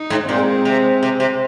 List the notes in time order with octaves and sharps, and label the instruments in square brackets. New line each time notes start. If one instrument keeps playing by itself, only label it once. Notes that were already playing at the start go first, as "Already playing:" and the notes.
Already playing: [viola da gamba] D#4
[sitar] G#2
[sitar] A#2 [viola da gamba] G#3 C4
[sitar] C3
C3
C3